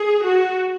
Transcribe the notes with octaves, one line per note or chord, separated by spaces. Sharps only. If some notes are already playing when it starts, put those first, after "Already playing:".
Already playing: G#4
F#4